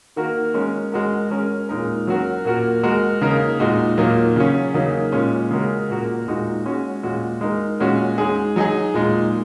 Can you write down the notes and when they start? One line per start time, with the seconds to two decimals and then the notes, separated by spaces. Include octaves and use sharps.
0.16 D#3 A#3 F#4 A#4
0.54 G#3 C#4 A#4
0.92 G#3 F#4 A#4
1.30 G#3 C#4 A#4
1.69 A#2 G#3 D#4 A#4
2.07 F#3 C#4 F#4 A#4
2.45 A#2 A#3 F#4 A#4
2.83 G#3 F#4 A#4
3.21 C#3 A#3 D#4 A#4
3.59 A#2 G#3 D#4 F#4
3.98 A#2 F#3 A#3 D#4
4.36 C#3 F#3 C#4
4.74 C#3 F#3 A#3 D#4
5.12 A#2 G#3 C#4
5.51 C#3 G#3 F#4 A#4
5.88 A#2 A#3 F#4 A#4
6.27 A#2 G#3 D#4 F#4
6.65 G#3 C#4 F#4
7.03 A#2 G#3 F#4
7.41 G#3 D#4 A#4
7.80 A#2 G#3 C#4 F#4
8.18 G#3 D#4 G#4
8.56 F#3 D#4 G#4
8.94 A#2 G#3 D#4